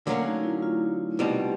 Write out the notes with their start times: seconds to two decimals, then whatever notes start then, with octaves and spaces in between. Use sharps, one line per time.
0.06 D3 F#3 A3 A#3 C#4
0.25 D#4
0.44 E4
0.62 F4
1.19 C2 B2 G3 C4